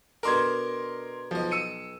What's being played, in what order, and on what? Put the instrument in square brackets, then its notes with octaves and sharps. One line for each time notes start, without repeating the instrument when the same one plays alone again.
[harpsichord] B2 D4 A4 [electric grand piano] A#4 C6 G#6
[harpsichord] B1 D#5 [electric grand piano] F3
[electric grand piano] E6 C#7 D#7